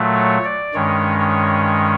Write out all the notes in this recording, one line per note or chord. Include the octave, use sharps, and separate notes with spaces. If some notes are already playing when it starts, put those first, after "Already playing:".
Already playing: A#2 F#3 A3
C#5
D5
G2 D#3 G#3 C#4 C#5
C#5